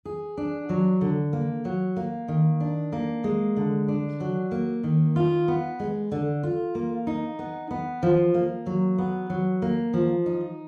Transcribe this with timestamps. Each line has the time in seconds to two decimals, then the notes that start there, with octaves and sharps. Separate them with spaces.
0.05 G#4
0.37 D4
0.69 F#3
1.01 D3
1.33 A#3
1.65 F#3
1.97 A#3
2.28 D#3
2.60 D4
2.93 A#3
3.24 G#3
3.57 D3
3.88 D4
4.20 F#3
4.52 A#3
4.84 D#3
5.16 F4
5.48 B3
5.80 G#3
6.12 D3
6.43 F4
6.75 A#3
7.07 D#4
7.39 B3
7.71 B3
8.03 F3
8.34 A#3
8.66 F#3
8.98 B3
9.30 F#3
9.62 A#3
9.94 F3
10.26 D#4